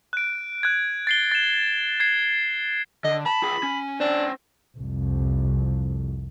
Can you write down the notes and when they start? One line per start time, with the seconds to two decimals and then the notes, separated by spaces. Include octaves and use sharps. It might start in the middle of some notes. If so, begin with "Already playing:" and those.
0.13 F#6 D7
0.63 F#6 G#6
1.07 A6 C7 G7
1.32 A6 E7
2.00 G#6 C7
3.04 D3 D#5
3.26 A5 B5
3.42 F4 G#4
3.63 C#4
4.00 C#4 D4 C5
4.78 C2 F2